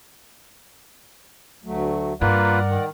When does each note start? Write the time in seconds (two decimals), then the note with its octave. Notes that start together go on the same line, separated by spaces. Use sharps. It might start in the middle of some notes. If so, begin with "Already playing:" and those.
1.64 D2 F#3 A3
2.21 G2 A#3 F4 A#4 B4 D5 F#5
2.70 D#3